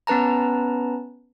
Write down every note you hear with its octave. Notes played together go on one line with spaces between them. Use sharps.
B3 C#4 B4 A5 A#5